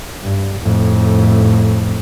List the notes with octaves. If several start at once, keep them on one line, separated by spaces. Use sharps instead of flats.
G2
F2 A2